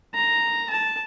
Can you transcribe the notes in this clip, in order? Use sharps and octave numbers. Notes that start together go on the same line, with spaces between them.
A#5
A5